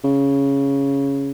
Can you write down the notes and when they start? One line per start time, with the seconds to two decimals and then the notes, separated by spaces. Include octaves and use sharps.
0.04 C#3